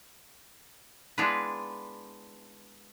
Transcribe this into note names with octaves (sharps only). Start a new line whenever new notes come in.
G#3 B3 D4 E4 F4 B4